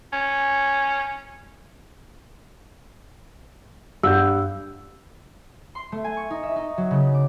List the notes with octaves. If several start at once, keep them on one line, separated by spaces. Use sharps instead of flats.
C#4
G2 F#5 E6 G6
C6
A3
G#5
C#6
D#4
E5
D#4
F#3
C#3
D6